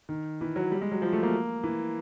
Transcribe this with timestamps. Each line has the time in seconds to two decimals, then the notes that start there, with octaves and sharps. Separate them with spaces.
0.09 D#3
0.41 E3
0.56 F#3
0.72 G3
0.82 G#3
0.92 F#3
1.02 F3
1.13 A3
1.23 A#3
1.63 E3